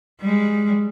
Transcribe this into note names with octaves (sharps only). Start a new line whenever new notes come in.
G3 G#3